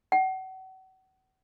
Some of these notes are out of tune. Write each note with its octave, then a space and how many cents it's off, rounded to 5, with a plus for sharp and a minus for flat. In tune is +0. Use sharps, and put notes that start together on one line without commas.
F#5 +35